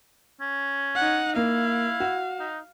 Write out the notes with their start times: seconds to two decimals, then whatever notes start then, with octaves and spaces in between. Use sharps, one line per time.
0.41 C#4
0.95 D#4 F#5
1.36 A#3 E4 F5
2.00 F#4
2.40 D#4